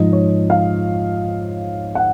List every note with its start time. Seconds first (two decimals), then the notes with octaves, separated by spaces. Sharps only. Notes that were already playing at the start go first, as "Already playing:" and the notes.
Already playing: G#2 F3 D#5
0.13 C#5
0.50 F5
1.95 F#5